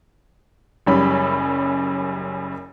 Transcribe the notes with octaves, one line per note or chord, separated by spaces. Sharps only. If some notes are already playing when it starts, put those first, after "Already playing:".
F#1 F#2 G3 C#4 B5